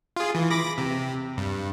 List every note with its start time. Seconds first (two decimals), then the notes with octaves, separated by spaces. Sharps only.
0.16 F4 G#4
0.35 E3
0.50 B5 D6 A#6
0.78 C3
1.37 G2